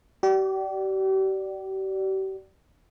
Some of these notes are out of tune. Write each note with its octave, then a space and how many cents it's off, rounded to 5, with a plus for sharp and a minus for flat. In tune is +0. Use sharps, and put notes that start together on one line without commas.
G4 -40 D5 +0